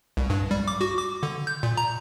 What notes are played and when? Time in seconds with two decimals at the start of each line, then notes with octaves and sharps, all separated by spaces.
0.17 C2
0.30 G2
0.51 G3
0.68 D6
0.81 F#4
0.97 D6
1.23 D3
1.47 G6
1.63 A#2
1.77 A#5